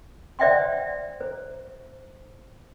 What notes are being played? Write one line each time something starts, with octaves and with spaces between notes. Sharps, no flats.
C5 D5 E5 F#5 G5 C6
C5